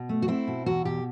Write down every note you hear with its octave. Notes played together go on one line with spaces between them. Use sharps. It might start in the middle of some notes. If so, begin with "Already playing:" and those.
Already playing: B2
A3
F#4
C4 E4
B2
E2 F#4
B2 G4